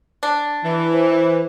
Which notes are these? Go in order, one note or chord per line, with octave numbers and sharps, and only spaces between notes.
D4
E3
C5